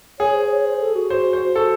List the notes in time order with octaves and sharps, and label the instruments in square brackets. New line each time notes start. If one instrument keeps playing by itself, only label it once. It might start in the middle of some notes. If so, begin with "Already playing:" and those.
[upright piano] G#4 [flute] C#5
[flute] C5
C#5
C5
A4
F#4
[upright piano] C5
C5
A4